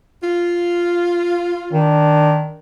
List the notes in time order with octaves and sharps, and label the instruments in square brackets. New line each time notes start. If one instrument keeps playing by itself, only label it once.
[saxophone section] F4
[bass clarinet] D#3 [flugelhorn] D4